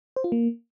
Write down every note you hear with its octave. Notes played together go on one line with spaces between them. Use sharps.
C5
F4
A#3